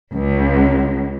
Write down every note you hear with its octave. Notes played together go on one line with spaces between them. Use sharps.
C#2